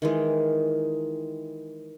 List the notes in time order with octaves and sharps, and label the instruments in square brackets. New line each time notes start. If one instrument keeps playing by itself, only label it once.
[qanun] D#3 E3 G#3